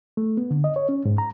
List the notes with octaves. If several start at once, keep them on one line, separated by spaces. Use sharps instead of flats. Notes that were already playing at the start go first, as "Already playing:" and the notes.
A3
B3
D3
D#5
C#5
C#4
G#2
A#5